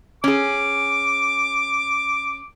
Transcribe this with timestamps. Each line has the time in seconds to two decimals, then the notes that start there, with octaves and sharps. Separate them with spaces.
0.24 C#4 G#4 D6